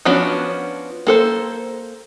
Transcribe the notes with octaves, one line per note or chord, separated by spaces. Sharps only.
F3 B3 C#4 D4 F#4
A#3 A4 C5